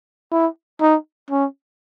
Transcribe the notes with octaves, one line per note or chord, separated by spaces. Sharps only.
E4
D#4
C#4